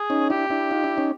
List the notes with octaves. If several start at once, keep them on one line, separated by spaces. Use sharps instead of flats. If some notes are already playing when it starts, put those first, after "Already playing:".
Already playing: G#4
C#4 D#4
D4 E4 G4
D4 E4
D#4 F4
D4 E4
C#4 D#4